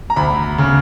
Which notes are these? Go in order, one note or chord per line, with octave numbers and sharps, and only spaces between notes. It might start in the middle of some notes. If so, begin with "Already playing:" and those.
A#5
D2 B5
C#3